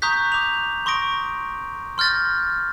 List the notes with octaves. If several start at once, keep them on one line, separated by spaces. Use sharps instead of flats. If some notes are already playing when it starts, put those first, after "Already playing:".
A#5 C#6 D#6 F#6 G6 B6
D6 F7
C6 C#6 D#6 A#6 D7
C6 F6 G6 A6 A#6